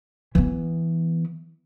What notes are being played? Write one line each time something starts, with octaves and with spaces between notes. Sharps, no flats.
E3 B3